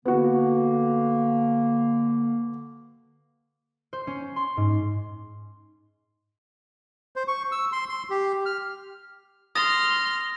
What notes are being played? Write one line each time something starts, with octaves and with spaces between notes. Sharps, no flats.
D3 A#3 B3 F#4
C5
C#4
C6
G#2
C5
C#6
E6
C6
C6
G4
F6
C6 D#6 F6 A6 A#6